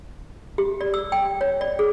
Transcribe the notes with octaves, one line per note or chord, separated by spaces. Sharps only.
G4
D5
E6
G5
C#5
D5
G#4